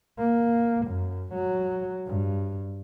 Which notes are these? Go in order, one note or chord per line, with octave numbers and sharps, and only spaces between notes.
A#3
F#2
F#3
G2